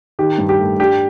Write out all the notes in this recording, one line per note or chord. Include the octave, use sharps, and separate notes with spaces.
D#3 G4
G2
G4
A3
D4 G4